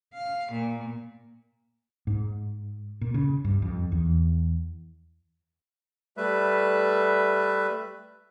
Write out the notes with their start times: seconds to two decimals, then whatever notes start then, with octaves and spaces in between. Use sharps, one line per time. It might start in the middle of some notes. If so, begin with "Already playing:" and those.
0.14 F5
0.52 A#2
2.07 G#2
3.01 A#2
3.14 C#3
3.44 G2
3.62 F2
3.92 E2
6.17 G3 A3 B4 E5